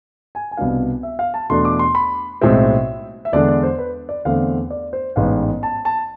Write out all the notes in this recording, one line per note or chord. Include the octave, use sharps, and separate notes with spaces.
G#5
G#5
C2 B2 B3 D4 F5
E5
F5
A5
E2 B2 A3 D4 C6
D6
C6
B5
B1 A2 G#3 C4 E5
E5
E2 D3 G#3 D4 D5
D5
C5
B4
D5
E2 D3 A3 C4 F5
D5
C5
A1 G#2 G#3 B3 F5
A5
A5